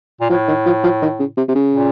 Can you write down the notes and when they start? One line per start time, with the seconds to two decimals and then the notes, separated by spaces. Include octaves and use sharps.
0.21 A#2
0.30 A2 F3
0.48 D#3
0.66 F3
0.83 F3
1.02 D#3
1.20 C#3
1.37 C3
1.49 C3
1.55 C#3
1.74 A#2